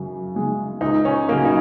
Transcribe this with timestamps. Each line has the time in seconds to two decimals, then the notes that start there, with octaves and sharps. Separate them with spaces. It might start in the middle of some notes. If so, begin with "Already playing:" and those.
Already playing: F#2 C#3
0.35 C#3 G#3
0.81 C#2 D#4
1.05 C#4
1.28 C#3 F#3 A#3
1.45 D#4